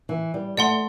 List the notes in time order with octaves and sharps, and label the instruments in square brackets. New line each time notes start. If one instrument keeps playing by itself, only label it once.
[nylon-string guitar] E3
G3
[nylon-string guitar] A3 [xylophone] D5 F#5 C6